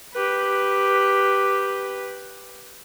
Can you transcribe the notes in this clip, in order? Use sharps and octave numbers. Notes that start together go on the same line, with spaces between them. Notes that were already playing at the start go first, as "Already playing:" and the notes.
G4 B4